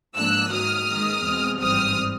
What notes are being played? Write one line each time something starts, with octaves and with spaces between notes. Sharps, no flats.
G#2 F3 A#3 D4 E6 F#6
G#2 D#3 F#3 A#3 D#6 F6
G#2 D#3 G#3
E2 B2 G#3 C4
G#1 G2 E3 G3 C4 D#6 F6